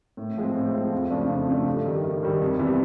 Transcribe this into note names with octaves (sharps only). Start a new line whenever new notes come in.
A2
F3 G#3 C4
A2
F3 G#3 C4
F2
C#3 F3 A3 D4
F2
C#3 F3 A3 D4
G2
D#3 G3
G2
D#3 G3
F2
C3 E3 G3 B3